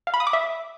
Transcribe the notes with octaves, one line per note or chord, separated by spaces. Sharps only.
F5
B5
D#6
D6
E5